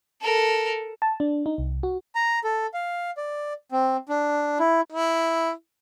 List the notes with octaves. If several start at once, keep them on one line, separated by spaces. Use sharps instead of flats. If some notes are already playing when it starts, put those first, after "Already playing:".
A4 A#4
A5
D4
D#4
C2
F#4
A#5
A4
F5
D5
C4
D4
E4
E4